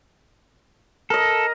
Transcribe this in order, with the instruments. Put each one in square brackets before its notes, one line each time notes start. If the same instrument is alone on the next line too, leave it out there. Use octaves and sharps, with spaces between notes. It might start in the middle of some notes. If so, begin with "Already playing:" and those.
[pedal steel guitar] A4 [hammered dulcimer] A#4 D#5